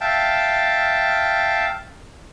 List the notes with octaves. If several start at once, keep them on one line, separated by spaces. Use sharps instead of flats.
E5 F5 G5 A5